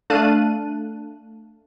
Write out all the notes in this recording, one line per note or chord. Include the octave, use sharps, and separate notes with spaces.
A3 D4 F5 A5 F#6 D#7